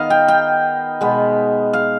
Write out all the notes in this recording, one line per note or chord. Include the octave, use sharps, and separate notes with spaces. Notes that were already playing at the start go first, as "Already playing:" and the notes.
Already playing: D#3 B3 D#5 F5
G5
G5
B2 G#3 B3
F5